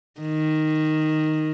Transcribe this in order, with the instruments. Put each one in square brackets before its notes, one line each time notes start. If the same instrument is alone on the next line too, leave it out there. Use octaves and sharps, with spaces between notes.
[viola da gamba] D#3